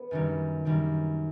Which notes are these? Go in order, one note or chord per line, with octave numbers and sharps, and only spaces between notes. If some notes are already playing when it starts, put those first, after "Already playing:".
Already playing: B3
F#2 D#3 G3
F#2 D#3 G3